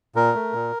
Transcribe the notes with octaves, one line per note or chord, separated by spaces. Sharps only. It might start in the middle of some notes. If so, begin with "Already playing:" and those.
A#2 A#4
A3
A#2